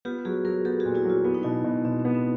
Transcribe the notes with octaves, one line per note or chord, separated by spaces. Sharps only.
B3 F4 G4
F#3 F#4 G#4
F#3 G#4 A#4
B3 G4 A4
A#2 F#4 G#4
E4 F#4
F#3 F4
B3 E4
D#4
B2 E4
B2
B2 C4
C4
B3
C4